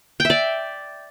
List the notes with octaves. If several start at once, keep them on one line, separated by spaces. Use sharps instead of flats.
G5
E5
D5